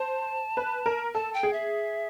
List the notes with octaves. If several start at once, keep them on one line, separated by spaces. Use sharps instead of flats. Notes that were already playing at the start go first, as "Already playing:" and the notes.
Already playing: C5 A5
B4
A#4
A4 A5
G5
G#4
E5